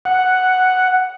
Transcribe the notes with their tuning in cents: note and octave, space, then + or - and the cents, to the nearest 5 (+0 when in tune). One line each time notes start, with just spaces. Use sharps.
F#5 +0